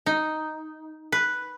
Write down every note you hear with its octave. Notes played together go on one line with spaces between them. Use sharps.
D#4
B4